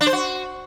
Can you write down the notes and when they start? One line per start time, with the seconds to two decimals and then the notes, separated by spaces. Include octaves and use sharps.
0.01 D4
0.07 C5
0.13 F#4